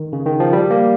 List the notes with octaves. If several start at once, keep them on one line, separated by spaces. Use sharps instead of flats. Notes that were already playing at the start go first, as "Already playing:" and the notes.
Already playing: D#3
C#3
D#3
F3
G3
A#3